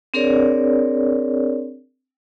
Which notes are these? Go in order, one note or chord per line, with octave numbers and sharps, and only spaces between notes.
C4 D4 G#4 A#4 C#5 D5